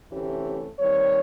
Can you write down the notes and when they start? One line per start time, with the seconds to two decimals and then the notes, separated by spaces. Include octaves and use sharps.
0.11 D2 C3 E3 A3 C#4 G4
0.79 D#2 D#3 G3 C4 C#5